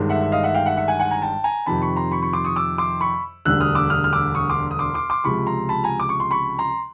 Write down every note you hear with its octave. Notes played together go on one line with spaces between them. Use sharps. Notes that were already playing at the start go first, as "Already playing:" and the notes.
Already playing: G1 G2 D#3 G#3
E5 F#5
E5
D#5 F5
E5 F#5
F5 G5
E5 F#5
E5 F#5
F#5 G#5
F#5 G#5
G#5 A#5
G5 A5
G#5 A#5
F2 C3 D#3 A5 B5
B5 C#6
A#5 C6
B5 C#6
B5 C#6
C6 D6
C#6 D#6
D6 E6
C6 D6
B5 C#6
E1 D2 D3 G3 E6 F#6
D#6 F6
D6 E6
D#6 F6
F6
D6 E6
C#6 D#6
C6 D6
D#6
C6 D6
C6 D6
C6 D6
C#2 C3 F3 G#3 B5 C#6
A#5 C6
A5 B5
G#5 A#5
D6
C#6
C6
B5 C#6
A#5 C6